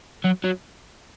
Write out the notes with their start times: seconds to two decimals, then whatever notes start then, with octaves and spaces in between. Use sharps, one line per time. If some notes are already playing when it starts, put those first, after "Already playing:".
0.24 F#3
0.44 F#3